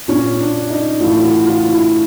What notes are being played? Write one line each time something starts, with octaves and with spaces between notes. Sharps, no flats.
A#2 C#4
D4
D#4
A2 E3 F4
F#4
F4
E4